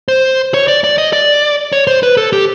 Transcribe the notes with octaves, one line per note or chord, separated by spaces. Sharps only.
C5
C#5
D5
D5
D#5
D5
C#5
C5
B4
A4
G4